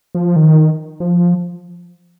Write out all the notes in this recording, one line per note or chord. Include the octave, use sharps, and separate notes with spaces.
F3
D#3
F3